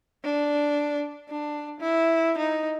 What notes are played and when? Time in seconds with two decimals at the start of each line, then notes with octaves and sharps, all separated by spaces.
0.24 D4
1.29 D4
1.80 E4
2.38 D#4